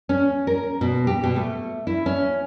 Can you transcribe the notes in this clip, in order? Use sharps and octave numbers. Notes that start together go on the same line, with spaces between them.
C#4
A#4
B2
G4
B2
A3
E4
C#4